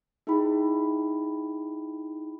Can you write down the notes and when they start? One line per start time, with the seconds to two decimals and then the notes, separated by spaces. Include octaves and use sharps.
0.27 D#4 E4 G#4 G5 B5